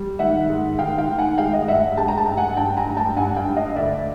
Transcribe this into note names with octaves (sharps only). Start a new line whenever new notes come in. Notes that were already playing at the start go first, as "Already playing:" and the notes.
Already playing: G3
D#3 E5 F#5
G#2
D#3 F5 G5
F5 G5
D#3
F#5 G#5
G#3 F5 G5
D#5 F5
G2 E5 F#5
G#3 G5 A5
A#5
G5 A5
G2
F#5 G#5
G2 G5 A5
G#5 A#5
G2
G5 A5
G2 F#5 G#5
F5 G5
G2
D#5 F5
D2 D5 E5